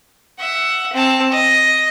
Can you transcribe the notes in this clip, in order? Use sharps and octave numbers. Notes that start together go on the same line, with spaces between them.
E5 F#5
C4 A5
D#5